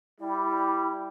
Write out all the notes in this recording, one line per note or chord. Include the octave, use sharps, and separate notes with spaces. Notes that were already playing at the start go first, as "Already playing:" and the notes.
G3 E4